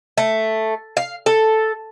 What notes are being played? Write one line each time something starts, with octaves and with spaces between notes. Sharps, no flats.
A3
F5
A4